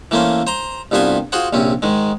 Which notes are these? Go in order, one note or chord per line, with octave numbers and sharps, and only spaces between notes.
E3 A3 A#3 C#4 C5
C5 A#5 C6
C2 G2 B3 F4 C5 G#5
F4 F#4 G#4 C5 F#5
A#1 C3 C4 C#4
G#2 D#3 G#3